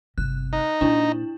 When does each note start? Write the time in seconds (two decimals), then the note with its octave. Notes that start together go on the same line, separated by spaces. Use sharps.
0.18 G1 C3 F#6
0.53 D#4
0.81 A#2 D4 E4